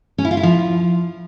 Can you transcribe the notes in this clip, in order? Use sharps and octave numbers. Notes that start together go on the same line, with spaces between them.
C#4
E4
F4
E4
F3